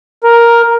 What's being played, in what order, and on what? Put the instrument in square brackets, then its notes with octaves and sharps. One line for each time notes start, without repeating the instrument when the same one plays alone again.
[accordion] A#4